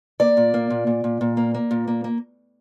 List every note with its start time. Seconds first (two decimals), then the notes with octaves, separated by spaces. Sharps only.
0.20 A#3 D5
0.37 A#2
0.54 A#3
0.70 A#2
0.87 A#2
1.04 A#2
1.21 A#2
1.37 A#3
1.54 A#3
1.71 A#2
1.88 A#3
2.04 A#3